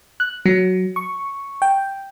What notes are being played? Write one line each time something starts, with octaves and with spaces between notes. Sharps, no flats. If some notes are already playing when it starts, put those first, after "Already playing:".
F#6
F#3
C#6
G5